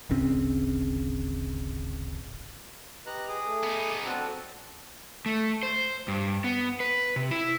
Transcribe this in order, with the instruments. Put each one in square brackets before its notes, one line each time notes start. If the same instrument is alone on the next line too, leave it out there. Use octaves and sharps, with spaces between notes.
[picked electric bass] D1 G#1 C#3 C4
[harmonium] G4 B4 D#5 [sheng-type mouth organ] A#5 F#6
[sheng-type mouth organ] G#4 D6 D#6
[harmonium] A3 A4
[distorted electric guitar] B3 D#4
[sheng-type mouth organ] C4 F#4 A4 [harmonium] D4
[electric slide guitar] A3
C5
G2
B3
B4
C3
E4